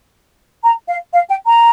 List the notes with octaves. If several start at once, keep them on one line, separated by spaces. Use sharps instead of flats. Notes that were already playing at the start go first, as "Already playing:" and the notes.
A#5
F5
F5
G5
A#5